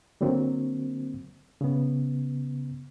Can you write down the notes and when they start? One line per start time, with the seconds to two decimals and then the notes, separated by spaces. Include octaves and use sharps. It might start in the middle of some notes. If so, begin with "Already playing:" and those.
0.21 D3 F#3 A#3 C4
1.61 C#3 B3